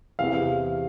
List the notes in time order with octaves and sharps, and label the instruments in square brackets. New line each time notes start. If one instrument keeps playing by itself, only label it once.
[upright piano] E2 C3 E3 F5